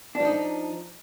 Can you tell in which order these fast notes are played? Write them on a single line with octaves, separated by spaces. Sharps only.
D4 F3 D#4